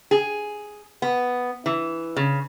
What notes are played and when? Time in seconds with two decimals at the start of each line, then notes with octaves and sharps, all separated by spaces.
0.11 G#4
1.02 B3
1.66 E3
2.16 C#3